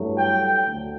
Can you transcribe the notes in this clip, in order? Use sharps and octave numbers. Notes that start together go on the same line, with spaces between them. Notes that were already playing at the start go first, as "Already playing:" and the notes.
Already playing: G2 F#3 A3 E4
G5
D2 D3